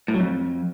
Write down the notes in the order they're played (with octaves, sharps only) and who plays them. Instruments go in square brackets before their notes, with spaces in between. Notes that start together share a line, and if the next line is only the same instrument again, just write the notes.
[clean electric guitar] A2
F#3
F2